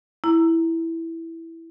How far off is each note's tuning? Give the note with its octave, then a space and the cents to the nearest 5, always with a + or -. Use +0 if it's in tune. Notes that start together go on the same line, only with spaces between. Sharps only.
E4 +0 A#5 +0